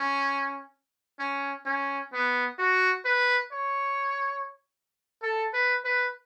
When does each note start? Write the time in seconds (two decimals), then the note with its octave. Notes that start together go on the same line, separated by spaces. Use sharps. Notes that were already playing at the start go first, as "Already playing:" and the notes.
Already playing: C#4
1.19 C#4
1.66 C#4
2.13 B3
2.59 F#4
3.05 B4
3.52 C#5
5.22 A4
5.53 B4
5.84 B4